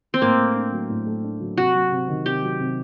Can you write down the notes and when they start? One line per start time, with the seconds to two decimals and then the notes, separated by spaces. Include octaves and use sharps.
0.14 C4
0.22 A2 A#3
0.39 A3
0.55 D4
0.72 F#3
0.90 A2
1.07 A3
1.24 D4
1.40 F#3
1.57 C3 F#4
1.74 F#3
1.91 C3
2.08 D#3
2.25 C3 G4
2.43 F#3
2.60 C3